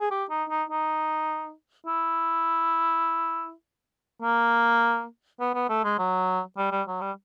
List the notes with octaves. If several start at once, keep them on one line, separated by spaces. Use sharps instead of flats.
G#4
G4
D#4
D#4
D#4
E4
A#3
B3
B3
A3
G#3
F#3
G3
G3
F#3
G3